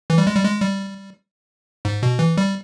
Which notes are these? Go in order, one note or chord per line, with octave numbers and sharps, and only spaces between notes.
E3
G3
G#3
G3
G#3
G3
G#2
B2
E3
G3